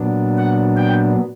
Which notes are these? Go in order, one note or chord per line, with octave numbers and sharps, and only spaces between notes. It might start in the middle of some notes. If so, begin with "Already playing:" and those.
Already playing: A#2 F#3 B3 D4
F#5
G5